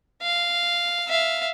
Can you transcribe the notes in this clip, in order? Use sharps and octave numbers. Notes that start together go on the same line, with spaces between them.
F5
E5 F5